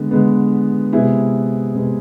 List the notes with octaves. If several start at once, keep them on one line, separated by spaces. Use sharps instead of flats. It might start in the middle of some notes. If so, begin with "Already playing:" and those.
Already playing: D3 G#3 B3
D3 G#3 B3
C3 G#3 B3 E4 G#4
C3 G#3 B3